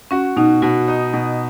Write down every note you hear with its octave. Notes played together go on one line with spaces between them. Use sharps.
C#4 F#4
B2 D#4
B2 F#4
D#4
B2